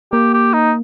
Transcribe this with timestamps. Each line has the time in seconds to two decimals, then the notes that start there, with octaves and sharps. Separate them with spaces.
0.12 A#3 G4
0.34 G4
0.53 D#4